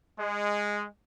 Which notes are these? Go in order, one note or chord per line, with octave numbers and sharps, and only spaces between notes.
G#3